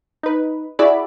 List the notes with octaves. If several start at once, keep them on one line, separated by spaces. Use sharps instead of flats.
D#4 B4
E4 F#4 G#4 D5 E5 B5